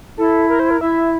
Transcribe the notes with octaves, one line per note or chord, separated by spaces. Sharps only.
E4 A4
A#4
C5
A#4
E4 E5